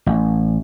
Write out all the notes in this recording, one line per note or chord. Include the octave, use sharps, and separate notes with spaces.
A1